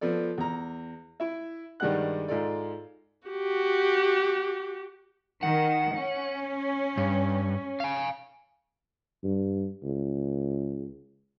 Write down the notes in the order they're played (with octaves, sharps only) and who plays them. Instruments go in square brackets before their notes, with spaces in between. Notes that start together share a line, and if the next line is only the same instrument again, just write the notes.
[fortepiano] F3 B3 A4 D5
E2 A#5
E4 E5
G2 D#3 G3 G#3 F#5 F#6
G#2 F4 A4 D5
[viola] F#4 G4
[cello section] D#3 [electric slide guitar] F#5
[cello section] C#4
[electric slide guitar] G2
F5 G#5
[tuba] G2
C#2